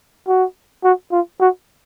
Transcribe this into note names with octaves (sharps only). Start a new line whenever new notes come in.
F#4
F#4
F4
F#4